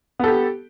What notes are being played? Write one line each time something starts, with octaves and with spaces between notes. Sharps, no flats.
B3 G4 A4